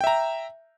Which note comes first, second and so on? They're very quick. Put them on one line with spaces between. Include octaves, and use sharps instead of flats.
G5 E5 A#5